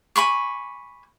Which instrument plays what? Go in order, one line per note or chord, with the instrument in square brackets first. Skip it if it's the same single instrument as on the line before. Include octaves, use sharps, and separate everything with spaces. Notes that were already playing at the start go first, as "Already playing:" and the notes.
[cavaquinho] G#5 B5 C#6 D6